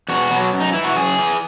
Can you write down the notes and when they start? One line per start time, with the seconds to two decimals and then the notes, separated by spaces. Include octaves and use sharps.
0.08 E2 F#4
0.31 B2 F#3
0.53 F#2
0.60 D#4
0.73 E3 E4
0.84 F#4
0.96 F#2 G#4
1.18 E3